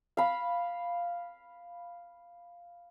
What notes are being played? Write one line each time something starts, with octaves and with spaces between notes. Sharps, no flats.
F5 B5